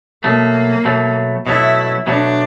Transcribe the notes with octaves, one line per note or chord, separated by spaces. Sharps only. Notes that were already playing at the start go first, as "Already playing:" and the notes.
B2 F#3 A3 A#3
B2 F#3 A3
B2 F#3 A3 E4
B2 F#3 A3 D4